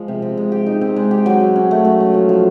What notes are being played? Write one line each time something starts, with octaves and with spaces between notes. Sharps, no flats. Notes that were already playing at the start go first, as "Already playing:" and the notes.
Already playing: F3 G#3
C3
C3
G#3
G4
D#4
C4
G#3
G4
F#3
F#3
C#4
A3
F#3
F#3
F3
F3